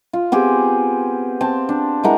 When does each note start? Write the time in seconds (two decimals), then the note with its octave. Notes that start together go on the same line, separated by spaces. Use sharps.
0.13 F4
0.32 B3 C4 G4 G#4
1.41 C4 A5
1.69 D4
2.03 G#3 E4 A#4 F#5